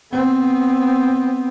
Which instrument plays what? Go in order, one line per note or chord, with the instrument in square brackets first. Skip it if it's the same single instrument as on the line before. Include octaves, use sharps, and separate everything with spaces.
[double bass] B3 C4